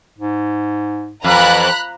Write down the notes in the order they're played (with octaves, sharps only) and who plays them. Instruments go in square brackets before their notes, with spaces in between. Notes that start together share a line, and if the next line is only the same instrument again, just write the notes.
[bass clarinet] G#2
[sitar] F2 [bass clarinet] E3 [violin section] A#5 B5 F#6